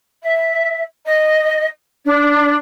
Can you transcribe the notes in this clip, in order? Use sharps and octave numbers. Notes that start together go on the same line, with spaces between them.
E5
D#5
D4